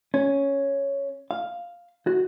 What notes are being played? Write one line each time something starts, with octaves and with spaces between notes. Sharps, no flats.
C#4
F5
F#4